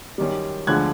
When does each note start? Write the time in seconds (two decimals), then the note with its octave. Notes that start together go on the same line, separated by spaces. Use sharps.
0.18 F#2 D#3 G3
0.67 D2 D3 F3 G#3 F#6 G#6